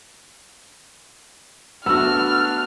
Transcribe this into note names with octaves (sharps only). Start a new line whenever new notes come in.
A3 B3 D4 F#4 E6 F6